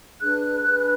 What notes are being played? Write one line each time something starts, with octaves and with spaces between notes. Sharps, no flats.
D4 G#4 B4 F#6
D4 G#4 B4